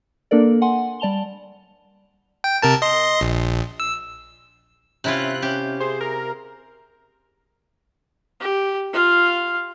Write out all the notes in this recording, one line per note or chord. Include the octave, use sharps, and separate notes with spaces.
A#3 D4 A4 A#4 D5
F#5 G#5 C6
G3 D5 A5 F7 G7
G5
C3 A#4 A5
D#5 C6
A#1
E6
C3 C#4 E4 F4 F#6
C#4 G4
G#4 C5
A#4
G4
F4 F5